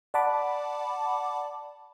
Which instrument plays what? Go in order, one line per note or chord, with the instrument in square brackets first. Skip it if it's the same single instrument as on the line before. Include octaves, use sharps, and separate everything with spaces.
[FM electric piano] D5 F#5 A5 B5 D6